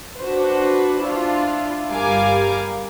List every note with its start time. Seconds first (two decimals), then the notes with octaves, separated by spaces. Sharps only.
0.18 D4 F#4 B4 C5
1.02 D4 E4 F4
1.90 G1 G3 A#4 F5 G#5 D6